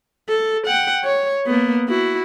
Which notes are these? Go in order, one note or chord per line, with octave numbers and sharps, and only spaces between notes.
A4
F#5 G5
C#5
A#3 B3
E4 F#4